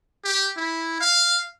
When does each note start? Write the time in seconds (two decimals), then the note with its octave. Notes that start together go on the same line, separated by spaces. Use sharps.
0.25 G4
0.57 E4
1.01 F5